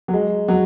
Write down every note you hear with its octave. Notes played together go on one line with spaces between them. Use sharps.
F#3
G#3
F#3